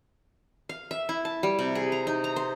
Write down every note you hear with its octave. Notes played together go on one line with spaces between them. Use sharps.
F5
E5
E4
A5
G3
C3
G#4
A#5
D#4
A#5
C5